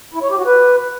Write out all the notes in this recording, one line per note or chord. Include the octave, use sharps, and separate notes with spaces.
E4
C#5
G4
F#4
B4